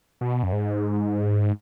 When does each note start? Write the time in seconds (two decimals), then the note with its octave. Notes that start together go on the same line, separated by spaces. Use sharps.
0.21 B2
0.43 F#2
0.52 G#2